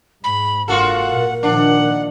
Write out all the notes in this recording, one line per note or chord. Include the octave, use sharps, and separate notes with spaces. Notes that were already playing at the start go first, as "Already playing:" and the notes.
G#2 B5
F#1 G#2 F4 F#4 A4 A#4 F#5
A#2
A#2 D#3 F3 D4 F#5